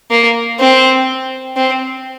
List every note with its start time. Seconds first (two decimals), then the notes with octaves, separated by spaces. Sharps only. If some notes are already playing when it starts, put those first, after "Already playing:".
0.11 A#3
0.59 C4
1.56 C4